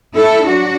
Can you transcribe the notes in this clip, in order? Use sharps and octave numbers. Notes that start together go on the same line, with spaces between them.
E4 A4
F#3 D4 F#4